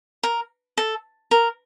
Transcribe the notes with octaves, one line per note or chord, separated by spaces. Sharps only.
A#4
A4
A#4